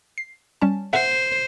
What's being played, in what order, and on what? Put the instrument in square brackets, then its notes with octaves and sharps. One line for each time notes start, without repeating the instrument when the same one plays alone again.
[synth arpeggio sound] C7
G3 C#4 A5
[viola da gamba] C5 [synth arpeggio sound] E5 F#5